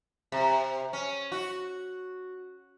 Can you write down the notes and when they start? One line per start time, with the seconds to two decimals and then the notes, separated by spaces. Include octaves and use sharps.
0.32 C3
0.93 C#4
1.32 F#4